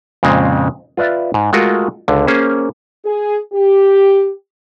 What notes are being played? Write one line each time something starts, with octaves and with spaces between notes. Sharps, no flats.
F2 A#2 C#3 G#3 C4
F4 B4 D5 E5
G#2
G#3 A3 F4 F#4 A#4
C#2 D3
A#3 C#4 G#4 C5
G#4
G4